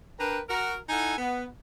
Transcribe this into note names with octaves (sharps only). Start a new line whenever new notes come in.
D4 A#4 B4 G5 A#5
F#4 A#4
D#4 E4 A4 F#5 G#5
B3